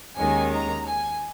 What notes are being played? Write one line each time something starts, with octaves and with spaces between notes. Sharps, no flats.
D#2 D#3 G#3 C#4 G#5
A#5
G#5